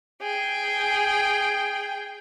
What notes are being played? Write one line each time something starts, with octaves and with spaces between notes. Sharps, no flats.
G#4 G5